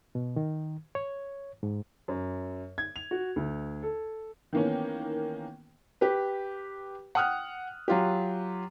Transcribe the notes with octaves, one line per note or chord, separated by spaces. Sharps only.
B2
D#3
C#5
G#2
F#2
G#6
F7
F#4
D2
A4
D#3 E3 A#3 B3 C#4
G4 B4
F#5 G5 D#6 F6 F#6
F#3 F4 G4